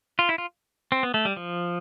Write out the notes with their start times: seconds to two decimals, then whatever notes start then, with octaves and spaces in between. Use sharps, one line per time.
0.19 F4
0.29 E4
0.38 F4
0.92 C4
1.03 B3
1.14 A3
1.25 G3
1.37 F3